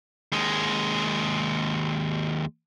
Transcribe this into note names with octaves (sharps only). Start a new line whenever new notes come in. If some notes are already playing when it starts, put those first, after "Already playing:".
D#2 G#3